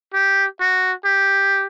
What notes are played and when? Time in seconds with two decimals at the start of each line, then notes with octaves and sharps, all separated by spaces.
0.14 G4
0.60 F#4
1.05 G4